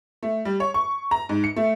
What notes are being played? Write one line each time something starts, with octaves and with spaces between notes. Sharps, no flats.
A3
G3
C#5
C#6
A#5
G#2
C#7
A3